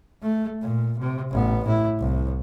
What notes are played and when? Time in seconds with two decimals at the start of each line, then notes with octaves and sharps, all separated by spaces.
0.22 A3
0.62 A#2
0.98 C3
1.31 A1 B3
1.65 A2 E4
2.00 C2